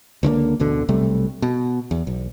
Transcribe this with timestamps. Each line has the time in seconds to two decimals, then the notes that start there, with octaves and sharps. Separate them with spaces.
0.23 C#2 D3 A3 A#3
0.60 A1 D2 B2 D3
0.89 B1 C3 G3 A3
1.42 B2
1.91 E2
2.07 B1